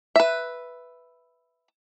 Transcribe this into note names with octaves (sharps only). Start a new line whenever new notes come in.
B4 E5